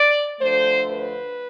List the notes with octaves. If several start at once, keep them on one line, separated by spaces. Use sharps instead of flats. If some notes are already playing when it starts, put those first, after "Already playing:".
Already playing: D5
D2 D3 F3 A3 C5
B4